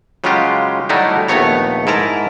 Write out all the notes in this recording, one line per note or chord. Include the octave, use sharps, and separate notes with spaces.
C#3 F#3 G#3 C#4 F4 G4
D3 F#3 G3 A3 D#4 E4
A#1 D#2 A3 B3 C#5 A#5
G#2 E4 A#4 A5 A#5